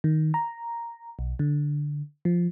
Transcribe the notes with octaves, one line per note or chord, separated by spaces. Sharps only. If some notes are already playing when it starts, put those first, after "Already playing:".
D#3
A#5
B1
D3
F3